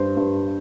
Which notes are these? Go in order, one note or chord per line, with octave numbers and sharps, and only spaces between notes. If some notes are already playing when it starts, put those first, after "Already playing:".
Already playing: G2 C5
G2